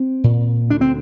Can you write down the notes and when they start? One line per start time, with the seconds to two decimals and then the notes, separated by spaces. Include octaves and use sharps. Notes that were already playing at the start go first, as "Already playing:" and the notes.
Already playing: C4
0.24 A#2
0.70 D2 D4
0.81 C4